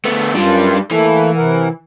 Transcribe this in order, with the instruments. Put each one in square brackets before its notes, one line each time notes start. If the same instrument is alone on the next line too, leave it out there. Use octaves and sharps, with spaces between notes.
[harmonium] D3 [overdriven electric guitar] A3 B3
[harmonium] F#2 F4 [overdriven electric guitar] G3 D4
[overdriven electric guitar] E3 [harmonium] A3 A#3 A4
[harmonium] C3 A#4 F#5